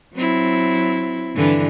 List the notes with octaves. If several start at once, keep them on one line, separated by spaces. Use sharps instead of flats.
F#3 C4 E4
G2 D3 E3